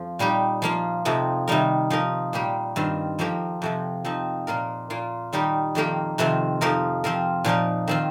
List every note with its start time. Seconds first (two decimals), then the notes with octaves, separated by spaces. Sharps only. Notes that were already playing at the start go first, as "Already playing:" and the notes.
Already playing: F2 F3
0.19 A#2 G3 D#4 G4
0.62 F3 A#3 F4
1.05 F2 C3 F3 D#4
1.48 C3 D#3 G3 D#4 A#4
1.90 F3 D#4 A#4
2.33 A#2 G3 A#3 G4
2.76 G2 D#3 C4 F4
3.19 F2 F3 A#3 G4 A#4
3.62 F2 C3 F3
4.05 F3 C4 D#4
4.47 A#2 A#3 F4 A#4
4.90 A#2 A#3 F4
5.33 D#3 G3 D#4 G4 A#4
5.75 F2 D#3 A#3 G4 A#4
6.18 F2 C3 D#3 C4 F4
6.61 F2 F3 D#4 A#4
7.04 F3 C4 F4 A#4
7.44 A#2 F3 D#4 A#4
7.88 D#3 C4 F4